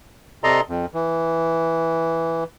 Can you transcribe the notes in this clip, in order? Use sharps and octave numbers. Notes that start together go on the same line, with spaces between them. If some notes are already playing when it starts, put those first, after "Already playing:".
C3 A4 D5 D#5 A#5 C6
F2
E3